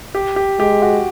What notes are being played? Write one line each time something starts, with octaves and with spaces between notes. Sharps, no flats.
G4
G4
G#3 G4
F#4